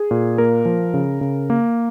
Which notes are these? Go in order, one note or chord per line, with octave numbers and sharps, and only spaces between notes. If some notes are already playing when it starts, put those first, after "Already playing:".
Already playing: G#4
A#2
A#3 A#4
F3
C#3
C#3
A#3